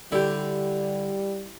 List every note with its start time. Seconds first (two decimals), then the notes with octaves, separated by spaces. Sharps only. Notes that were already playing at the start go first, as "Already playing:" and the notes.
0.12 D3 G3 E4 G4